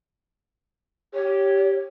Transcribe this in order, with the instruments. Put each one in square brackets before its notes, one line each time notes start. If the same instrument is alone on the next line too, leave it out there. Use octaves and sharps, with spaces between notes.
[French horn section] G4 [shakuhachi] C#5